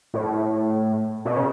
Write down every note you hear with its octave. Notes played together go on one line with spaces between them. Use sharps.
A2
B2
C#3